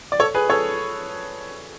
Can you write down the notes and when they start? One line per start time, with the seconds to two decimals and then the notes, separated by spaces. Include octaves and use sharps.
0.12 D5
0.19 A4 C#5
0.34 G#4 B4
0.50 A4 C#5